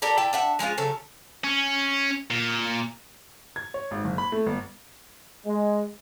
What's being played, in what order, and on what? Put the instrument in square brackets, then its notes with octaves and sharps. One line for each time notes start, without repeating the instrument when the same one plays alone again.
[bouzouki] G4 A4 A#4 D5
E4 D5 G5 A5
D4 E5 F#5
F3 G#3 C#4 F4
C#3 F#3 A4 C#5
[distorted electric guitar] C#4
A#2
[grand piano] G#6
C#5
G#1
F#1
B5
A3
G1
[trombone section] G#3